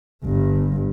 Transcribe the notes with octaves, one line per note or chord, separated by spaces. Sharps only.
G1 G2